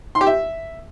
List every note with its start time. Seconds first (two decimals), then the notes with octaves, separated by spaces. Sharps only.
0.15 C6
0.21 G4
0.27 E5